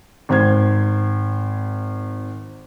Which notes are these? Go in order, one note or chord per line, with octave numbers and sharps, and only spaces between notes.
G#1 C5 G#6